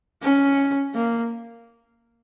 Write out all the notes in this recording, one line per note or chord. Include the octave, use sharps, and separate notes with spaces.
C#4
A#3